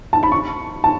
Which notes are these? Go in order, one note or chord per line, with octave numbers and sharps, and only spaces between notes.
A5
B5
C#6
A5